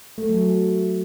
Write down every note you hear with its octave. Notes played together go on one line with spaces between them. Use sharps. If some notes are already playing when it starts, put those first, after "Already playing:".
A3
F#3
F#3